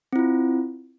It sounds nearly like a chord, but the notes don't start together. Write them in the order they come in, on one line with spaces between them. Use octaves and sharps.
C4 E4 F4